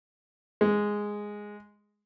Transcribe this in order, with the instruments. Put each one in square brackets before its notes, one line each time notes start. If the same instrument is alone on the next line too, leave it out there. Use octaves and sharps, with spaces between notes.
[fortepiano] G#3